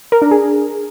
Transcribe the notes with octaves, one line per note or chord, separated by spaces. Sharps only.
A#4
D4
G#4